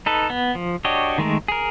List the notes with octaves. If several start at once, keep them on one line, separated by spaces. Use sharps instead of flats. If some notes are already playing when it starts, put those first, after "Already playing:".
D#4 A4 B4
B3
F3
D4 F#4 G4 C#5 D#5
D#3 G#3 A3 A#4
G#4 A#4